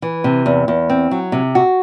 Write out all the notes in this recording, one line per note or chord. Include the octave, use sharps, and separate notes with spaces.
E3
C3
E2
E2
C4
F#3
C3
F#4